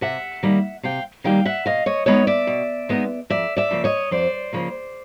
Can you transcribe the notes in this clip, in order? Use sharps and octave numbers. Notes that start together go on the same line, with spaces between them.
C3 E5 F#5
D#3 G3 A#3
C3 F5 G5
D#3 G3 A#3 F5 G5
E5 F#5
B2 D#5 F5
C#5 D#5
G#3 B3 D#4 C#5 D#5
D5 E5
B2
G#3 B3 D#4
F2 D5 E5
D5 E5
C#3 F3 A#3
C#5 D#5
F2 C5 D5
C#3 F3 A#3